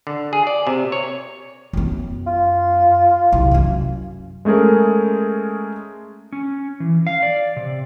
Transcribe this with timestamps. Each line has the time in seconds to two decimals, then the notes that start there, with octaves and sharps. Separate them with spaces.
0.07 D3
0.33 G#4
0.47 D5
0.67 C3
0.92 C#5
1.73 F#2 B3
2.27 F4
3.32 C2 F#2
3.51 F#2 C#4
4.45 G#3 A3 C#4 G#4 A#4
6.32 C#4
6.80 E3
7.07 F5
7.23 D5
7.56 C3